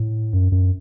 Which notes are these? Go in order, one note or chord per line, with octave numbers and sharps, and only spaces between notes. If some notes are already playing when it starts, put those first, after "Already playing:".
Already playing: A2
F#2
F#2